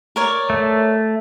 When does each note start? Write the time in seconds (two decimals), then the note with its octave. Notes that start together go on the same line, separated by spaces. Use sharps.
0.16 A#4 C#5 D5
0.50 A3